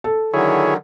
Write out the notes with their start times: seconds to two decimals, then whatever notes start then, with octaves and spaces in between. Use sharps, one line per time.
0.04 A4
0.33 D3 D#3 F#3 E4 G#4 C#5